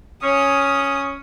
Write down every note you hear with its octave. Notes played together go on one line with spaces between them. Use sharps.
C#4 D#6